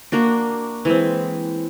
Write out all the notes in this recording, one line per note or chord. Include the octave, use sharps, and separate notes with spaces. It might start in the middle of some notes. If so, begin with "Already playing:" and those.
A#3 D4 F#4
E3 G#3 C4